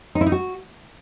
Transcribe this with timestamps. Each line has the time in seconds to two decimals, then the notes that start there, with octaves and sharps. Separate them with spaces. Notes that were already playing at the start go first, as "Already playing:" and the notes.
0.15 D#4
0.21 E4
0.26 D#4
0.32 F#4